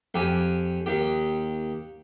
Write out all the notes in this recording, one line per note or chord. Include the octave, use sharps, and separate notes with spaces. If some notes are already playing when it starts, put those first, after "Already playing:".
F2 G4 G#5
D#2 G4